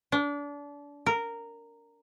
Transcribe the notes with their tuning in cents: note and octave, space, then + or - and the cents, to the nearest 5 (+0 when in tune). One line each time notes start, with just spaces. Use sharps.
D4 -30
A#4 -10